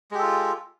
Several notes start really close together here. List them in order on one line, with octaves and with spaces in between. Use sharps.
G#3 G4 A4 F4